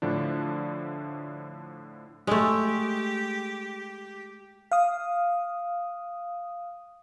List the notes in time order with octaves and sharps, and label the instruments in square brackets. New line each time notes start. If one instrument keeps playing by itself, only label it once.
[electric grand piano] A2 D3 F3 D4
[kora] G#3 A3 [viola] G4
[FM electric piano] F5 D#6